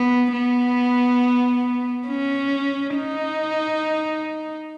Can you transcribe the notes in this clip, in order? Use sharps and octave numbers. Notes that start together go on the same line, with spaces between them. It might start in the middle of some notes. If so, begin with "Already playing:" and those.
Already playing: B3
B3
C#4
D#4